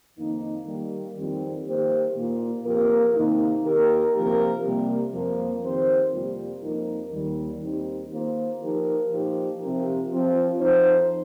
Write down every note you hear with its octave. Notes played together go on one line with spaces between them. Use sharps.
F2 D#3 A#3 D#4
D#3 G3 A#3
F2 D#3 G3 C4 F4
D#3 A#3 G4 C5
A#2 A#3 F4
F2 F3 A#3 G4 A#4
C3 D#3 A#3 D#4
D#3 A#3 G4 A#4
C3 F3 A#3 G4 A#4
C3 G3 A#3
F2 F3 A#3
F2 D#3 C4 G4 C5
F2 C3 G3 A#3 F4
F2 F3 A#3 D#4 A#4
D#2 D#3 G3
D#2 D#3 C4 D#4 G4
D#3 A#3 F4 C5
F3 D#4 G4 A#4
A#2 F3 D#4 G4
C3 F3 C4 G4 A#4
F3 C4 F4
F2 F3 D#4 C5